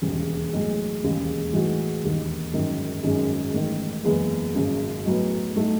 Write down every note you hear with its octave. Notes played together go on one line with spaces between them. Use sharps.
E1 D#2 C#3
B1 A2 G#3
E1 D#2 C#3 G#3
A2 E3 G#3 D#4 F#4
E1 D#2 D#3
G#1 F#2 D#3
G#1 F#2 D#3 G#3
A1 G#2 D#3
F#1 E2 C#3 G#3 B3
G#1 F#2 C#3
B1 A2 F#3 B3
A2 F#3 A3 D#4 F#4